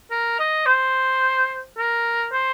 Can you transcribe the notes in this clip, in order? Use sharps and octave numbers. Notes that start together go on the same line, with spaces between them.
A#4
D#5
C5
A#4
C5